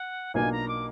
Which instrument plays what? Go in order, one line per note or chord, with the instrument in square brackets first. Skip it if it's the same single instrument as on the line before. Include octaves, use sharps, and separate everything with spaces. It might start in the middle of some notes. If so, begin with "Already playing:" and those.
Already playing: [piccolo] F#5
[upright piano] B1 B2 A#3 D4 F4 [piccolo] G#5
[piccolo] A#5
D6